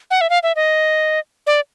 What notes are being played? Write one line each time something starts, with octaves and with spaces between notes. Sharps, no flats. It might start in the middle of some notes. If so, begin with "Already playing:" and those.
F#5
E5
F5
E5
D#5
D5